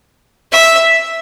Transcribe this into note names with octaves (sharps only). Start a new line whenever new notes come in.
E5